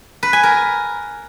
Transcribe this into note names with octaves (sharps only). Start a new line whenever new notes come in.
B4
G#5
A#4